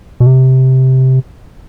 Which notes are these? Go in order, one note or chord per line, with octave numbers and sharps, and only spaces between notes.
B2
C3